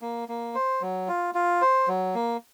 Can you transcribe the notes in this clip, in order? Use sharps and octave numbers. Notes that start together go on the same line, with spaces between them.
A#3
A#3
C5
F#3
F4
F4
C5
F#3
A#3